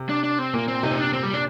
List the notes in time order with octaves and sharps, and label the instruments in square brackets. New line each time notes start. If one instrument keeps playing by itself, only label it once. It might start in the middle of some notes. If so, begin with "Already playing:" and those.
Already playing: [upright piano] C3
[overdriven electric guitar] D4
D4
C4
[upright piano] A#2 [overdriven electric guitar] A#3
[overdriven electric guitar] C4
[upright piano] C3 [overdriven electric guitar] D#4
[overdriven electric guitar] C4
D4
C4
G3
D4